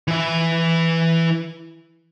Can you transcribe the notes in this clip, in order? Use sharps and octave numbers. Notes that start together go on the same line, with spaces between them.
E3 E5